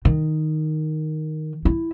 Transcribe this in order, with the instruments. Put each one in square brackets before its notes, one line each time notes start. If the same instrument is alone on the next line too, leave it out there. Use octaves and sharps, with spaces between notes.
[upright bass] D#3
E4